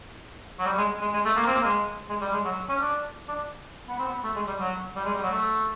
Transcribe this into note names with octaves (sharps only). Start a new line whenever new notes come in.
F#3
G3
G#3
G#3
G#3
A3
A#3
C4
A#3
G#3
G#3
G3
G#3
F#3
C#4
D4
D4
B3
C4
B3
A3
G#3
G3
F#3
G3
G#3
G3
F#3
A3